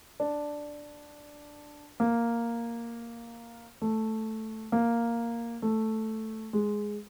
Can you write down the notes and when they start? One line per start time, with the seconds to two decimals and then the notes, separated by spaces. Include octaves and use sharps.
0.20 D4
2.00 A#3
3.82 A3
4.72 A#3
5.62 A3
6.53 G#3